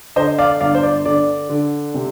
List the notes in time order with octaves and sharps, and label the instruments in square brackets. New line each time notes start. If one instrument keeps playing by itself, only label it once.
[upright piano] D3 C5 D#5
D5 F5
G1 D5 F5
C5
D5
D3 D5
D3
C3